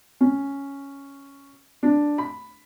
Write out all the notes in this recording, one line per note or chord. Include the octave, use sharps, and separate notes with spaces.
C#4
D4
B5